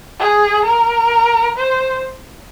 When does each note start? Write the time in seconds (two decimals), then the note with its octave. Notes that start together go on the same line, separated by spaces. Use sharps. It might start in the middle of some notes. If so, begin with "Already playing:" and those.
0.19 G#4
0.65 A#4
1.57 C5